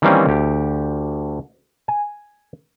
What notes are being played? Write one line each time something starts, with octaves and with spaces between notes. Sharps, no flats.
D#3 E3 G3 A#3 C4 C#4
D2 G4
G#5